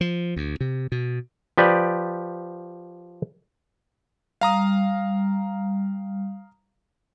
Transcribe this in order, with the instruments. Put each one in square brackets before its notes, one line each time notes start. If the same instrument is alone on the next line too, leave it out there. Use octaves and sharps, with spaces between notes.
[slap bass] F3
D2
C3
B2
[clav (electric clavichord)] F3 G4 B4 D5
[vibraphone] G3 [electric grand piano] F5 A#5 D#6